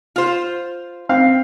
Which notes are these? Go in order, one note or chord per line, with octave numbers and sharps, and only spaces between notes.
F4 C5
C4 F5